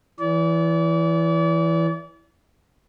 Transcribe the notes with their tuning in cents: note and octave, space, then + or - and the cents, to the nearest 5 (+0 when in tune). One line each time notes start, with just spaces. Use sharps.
E3 +10 D5 -35